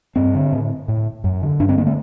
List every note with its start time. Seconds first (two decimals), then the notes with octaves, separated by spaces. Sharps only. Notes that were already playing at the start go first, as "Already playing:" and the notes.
0.16 G2 C4
0.35 D3
0.52 A2
0.88 A2
1.24 F#2
1.42 D3
1.60 G2 D4
1.69 C4
1.78 D3 A#3
1.87 A3